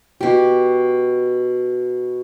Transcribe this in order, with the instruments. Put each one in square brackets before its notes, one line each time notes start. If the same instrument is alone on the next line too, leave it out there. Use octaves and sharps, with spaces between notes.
[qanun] B2 G4